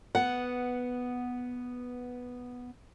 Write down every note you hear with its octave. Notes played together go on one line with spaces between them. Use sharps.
B3 F#5